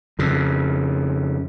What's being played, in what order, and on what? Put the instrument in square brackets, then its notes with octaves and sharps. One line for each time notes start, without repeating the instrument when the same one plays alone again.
[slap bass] F2 C#3